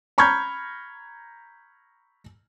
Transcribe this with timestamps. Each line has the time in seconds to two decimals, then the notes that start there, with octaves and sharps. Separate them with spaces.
0.18 A#5 B5 C#6 F6 G6 G#6